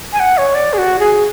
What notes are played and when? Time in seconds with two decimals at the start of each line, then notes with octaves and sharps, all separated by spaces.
0.12 G#5
0.20 F#5
0.37 C#5
0.55 D5
0.73 G#4
0.78 F#4
0.99 G#4